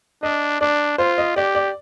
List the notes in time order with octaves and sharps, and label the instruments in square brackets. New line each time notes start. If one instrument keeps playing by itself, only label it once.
[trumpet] D4 [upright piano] D#5
[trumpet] D4 [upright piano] D5
[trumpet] F4 [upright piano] C5
[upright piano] D#5
[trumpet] G4 [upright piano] D5
[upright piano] D5